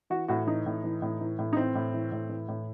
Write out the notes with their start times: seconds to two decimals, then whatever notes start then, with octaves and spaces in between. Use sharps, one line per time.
0.10 E3 F#4
0.28 A2 F#4
0.47 E3 D#4
0.66 A2
0.84 E3
1.02 A2
1.21 E3
1.39 A2
1.53 D#4
1.56 E3 C4
1.75 A2
1.94 E3
2.12 A2
2.29 E3
2.48 A2